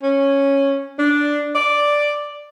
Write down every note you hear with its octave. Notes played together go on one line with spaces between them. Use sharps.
C#4
D4
D5